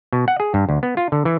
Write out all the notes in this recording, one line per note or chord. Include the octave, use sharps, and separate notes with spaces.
B2
F#5
G#4
G2
D2
B3
F4
D3
E3